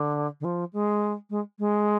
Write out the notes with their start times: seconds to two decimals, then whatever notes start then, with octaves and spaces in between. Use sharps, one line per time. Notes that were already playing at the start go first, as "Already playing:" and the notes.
Already playing: D3
0.40 D3
0.44 F3
0.73 G#3
1.30 G#3
1.59 G#3